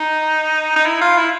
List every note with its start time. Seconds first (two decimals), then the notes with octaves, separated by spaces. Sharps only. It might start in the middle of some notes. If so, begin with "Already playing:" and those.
Already playing: D#4
0.76 D#4
0.86 E4
1.01 F4
1.18 E4